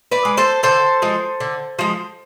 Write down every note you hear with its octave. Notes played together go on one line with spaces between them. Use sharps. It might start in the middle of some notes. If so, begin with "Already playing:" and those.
B4 D5
G#3
A4 C5
D3 A4 C5
F3 G#3
D3
F3 G#3